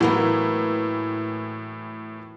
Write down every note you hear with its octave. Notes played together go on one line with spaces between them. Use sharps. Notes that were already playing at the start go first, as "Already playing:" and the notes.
A2 E3 F#3 A#3 B3